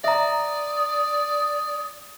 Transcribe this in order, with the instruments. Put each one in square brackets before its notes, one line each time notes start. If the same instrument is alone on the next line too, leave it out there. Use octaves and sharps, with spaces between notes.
[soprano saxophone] D5 [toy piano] E5 A#5 [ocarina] D#6